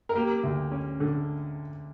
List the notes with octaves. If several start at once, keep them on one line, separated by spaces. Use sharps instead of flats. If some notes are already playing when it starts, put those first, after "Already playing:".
A#4
A#3 G4
D2
C#4
D3